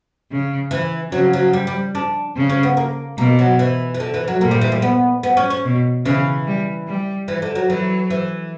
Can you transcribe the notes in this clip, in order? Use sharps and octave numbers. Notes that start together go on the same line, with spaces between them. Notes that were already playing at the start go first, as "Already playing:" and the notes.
C#3
E3
C#3 F#3
F#3
G3
G3
D4
C#3
C#4
B3
A#3
B2 A#3
F#3
E3
E3
D3
E3
F#3
A#2 A#3
G3
E3
G3
B3
B3
C#4
C#4
B2
C#3 E3
G3
G3
E3
D3
F#3
E3 F#3
E3